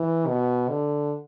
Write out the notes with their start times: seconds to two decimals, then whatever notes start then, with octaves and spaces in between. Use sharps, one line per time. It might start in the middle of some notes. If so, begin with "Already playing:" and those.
Already playing: E3
0.28 B2
0.69 D3